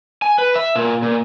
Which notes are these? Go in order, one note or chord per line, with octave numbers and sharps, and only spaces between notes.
G#5
B4
E5
A#2
A#2